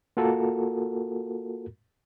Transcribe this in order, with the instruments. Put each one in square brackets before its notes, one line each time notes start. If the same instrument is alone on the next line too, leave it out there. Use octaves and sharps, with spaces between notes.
[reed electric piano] A#3 F4 F#4 A4 A#4